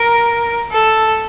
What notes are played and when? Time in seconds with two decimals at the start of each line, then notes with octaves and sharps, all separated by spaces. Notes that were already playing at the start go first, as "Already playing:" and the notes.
Already playing: A#4
0.72 A4